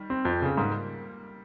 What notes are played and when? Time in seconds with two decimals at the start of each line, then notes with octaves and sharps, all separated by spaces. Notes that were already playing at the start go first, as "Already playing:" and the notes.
Already playing: D#3 G3
0.10 C4
0.25 F2
0.42 C#3 C4
0.57 G#2 G3 A#3
0.69 A#3